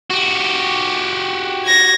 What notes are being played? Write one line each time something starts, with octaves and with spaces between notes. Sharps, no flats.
F#4 G4
G#6 A#6